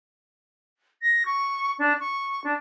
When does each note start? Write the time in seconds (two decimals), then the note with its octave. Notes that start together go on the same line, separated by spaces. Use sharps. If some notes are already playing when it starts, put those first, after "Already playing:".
1.02 A#6
1.26 C#6
1.79 D4
2.00 C#6
2.44 D4